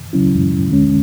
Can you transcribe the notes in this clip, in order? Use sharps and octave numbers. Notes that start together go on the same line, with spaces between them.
D2 C#3 F#3 C#4 E4
D2 D3 G#3 C#4